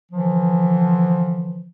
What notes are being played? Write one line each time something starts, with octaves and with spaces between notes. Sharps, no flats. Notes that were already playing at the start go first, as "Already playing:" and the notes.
D3 E3 F3